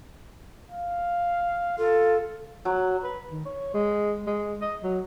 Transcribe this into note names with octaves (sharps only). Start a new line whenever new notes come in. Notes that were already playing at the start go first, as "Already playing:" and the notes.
F5
F4 A4
F#3
B4
D#3
C#5
G#3
G#3
D#5
F#3